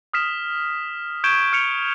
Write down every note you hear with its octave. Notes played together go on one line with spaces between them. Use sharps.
D#6 F6 B6 E7
C#6 G6 G#6 D7 E7 G7
F6 C#7 F7